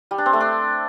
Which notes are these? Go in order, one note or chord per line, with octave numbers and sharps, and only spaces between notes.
G3
D4
C4
A3
D4